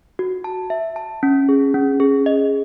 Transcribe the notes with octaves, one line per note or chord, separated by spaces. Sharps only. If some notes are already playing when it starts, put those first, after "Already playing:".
F#4
A5
E5
A5
C#4
G#4
C#4
G#4
D#5